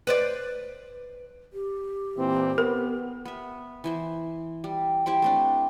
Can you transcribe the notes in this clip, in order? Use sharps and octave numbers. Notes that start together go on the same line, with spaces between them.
B4 C5 D5
G4
A#2 E3 C4
B3 A#4
B3 E5
E3 E4 C5
G3
E4 G4 C5 G5
A3 C4 D4